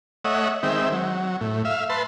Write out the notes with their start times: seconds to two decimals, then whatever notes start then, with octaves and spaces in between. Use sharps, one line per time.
0.25 A3 C#5 D#5 E5 F#5
0.63 D#3 G#3 C4 E5 G5
0.92 F#3
1.41 A2
1.65 E5 F5
1.89 B4 A5 C6